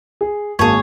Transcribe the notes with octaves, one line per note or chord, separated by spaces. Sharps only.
G#4
G#1 A#3 G#4 C#5 A5